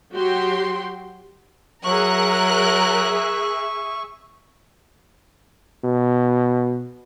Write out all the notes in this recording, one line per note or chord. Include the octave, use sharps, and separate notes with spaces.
F#3 F#4 G4 G5 C6
F#3 G#4 A#4 E5 C#6 F#6
B2